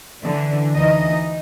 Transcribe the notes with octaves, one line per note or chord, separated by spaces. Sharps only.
D3 E3 D4
D2 E3 D#4 D#5
D#4